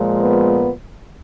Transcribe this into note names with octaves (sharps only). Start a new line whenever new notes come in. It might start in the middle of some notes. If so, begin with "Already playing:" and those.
Already playing: A#2 F3 G#3
B3